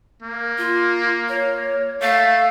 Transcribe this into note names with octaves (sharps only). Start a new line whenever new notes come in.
A#3
F4
C#5
A3 F5